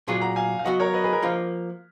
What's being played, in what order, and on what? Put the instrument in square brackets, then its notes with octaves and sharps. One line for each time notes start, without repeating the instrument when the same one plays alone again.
[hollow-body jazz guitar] A#2 F#3 B3 F4 G#4
[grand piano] F#5 A#5
F5 G#5
F5
[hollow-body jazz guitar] F#3 B3 F#4 [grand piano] D#5 F#5
[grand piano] A#4 C#5
B4 D#5
G#4 B4
A#4
[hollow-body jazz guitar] F3 A#3 F4